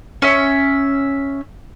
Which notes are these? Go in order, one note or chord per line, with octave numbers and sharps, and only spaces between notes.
C#4 E5